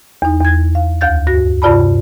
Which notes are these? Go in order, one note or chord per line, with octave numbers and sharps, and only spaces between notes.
E2 D#4
E2 G#6
F5
D2 F5 G6 A6
G2 F#4 A#6
G2 C3 F4 D5 A5 B5